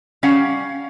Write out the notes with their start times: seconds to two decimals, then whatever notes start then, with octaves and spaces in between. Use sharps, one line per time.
0.23 G3 C#4 F5 F#5